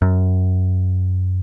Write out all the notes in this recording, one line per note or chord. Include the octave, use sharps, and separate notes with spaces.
F#2